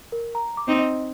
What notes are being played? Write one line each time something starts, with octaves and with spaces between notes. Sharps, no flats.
A#4
A#5
D6
C4 D#4
D#5